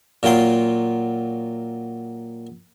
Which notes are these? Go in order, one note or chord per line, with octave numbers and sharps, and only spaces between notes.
A#2 F#3 F4 G5 C6